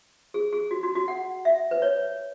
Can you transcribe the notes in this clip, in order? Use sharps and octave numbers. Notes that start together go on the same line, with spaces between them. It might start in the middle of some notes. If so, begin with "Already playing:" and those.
G#4
G#4
F#4
F#4
F#4
F#5
E5
B4
C#5